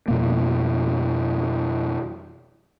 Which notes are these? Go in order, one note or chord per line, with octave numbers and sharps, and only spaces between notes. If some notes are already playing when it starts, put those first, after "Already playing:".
F2 B2 A#3